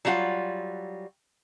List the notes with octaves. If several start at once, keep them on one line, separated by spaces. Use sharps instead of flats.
F#3 G3 D4 F4 F#5